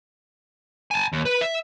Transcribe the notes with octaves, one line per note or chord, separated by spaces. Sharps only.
G#5 A5
D#2
B4
E5